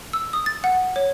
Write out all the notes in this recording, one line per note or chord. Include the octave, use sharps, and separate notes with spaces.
E6
D#6
A6
F#5
C#5